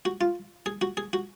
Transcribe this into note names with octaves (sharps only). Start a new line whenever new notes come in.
F#4
F4
G#4
F#4
G#4
F#4